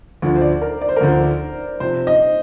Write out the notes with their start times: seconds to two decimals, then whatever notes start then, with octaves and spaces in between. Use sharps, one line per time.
0.22 D2 D3 F3
0.36 C5
0.42 D5
0.61 A#4
0.81 D5
0.89 C5
0.96 A#4
1.00 D2 D3 F3 C5
1.80 C3 F3 C4 C5
2.07 D#5